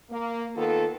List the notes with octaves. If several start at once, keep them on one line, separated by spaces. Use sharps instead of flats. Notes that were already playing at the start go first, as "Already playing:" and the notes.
A#3
D#3 B3 F4 A4